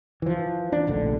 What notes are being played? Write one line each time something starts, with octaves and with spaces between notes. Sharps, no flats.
E3 F3
D4
F1 A#1 D3